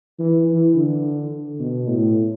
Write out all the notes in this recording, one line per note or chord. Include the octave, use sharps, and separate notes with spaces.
E3
E3
D3
B2
A2